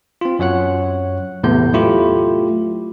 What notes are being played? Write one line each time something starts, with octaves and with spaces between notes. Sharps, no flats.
C4 F4
F#2 F#3 C#5 F#5 F#6
E2 A2 C3 A3 B3 G6
F#3 A3 E4 F4 G4